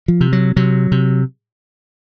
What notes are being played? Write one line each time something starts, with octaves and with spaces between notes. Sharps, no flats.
F3
C3
F#3
C3 F#3
C3